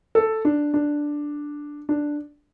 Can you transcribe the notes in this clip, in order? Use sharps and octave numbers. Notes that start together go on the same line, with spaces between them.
A4
D4
D4
D4